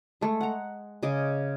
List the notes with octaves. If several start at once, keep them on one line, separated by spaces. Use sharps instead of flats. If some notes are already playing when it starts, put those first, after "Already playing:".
G#3 A3
F#5 A#5
C#3 G#4 D#5 D6